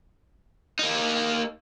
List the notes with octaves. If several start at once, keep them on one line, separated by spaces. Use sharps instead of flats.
A#3 D#4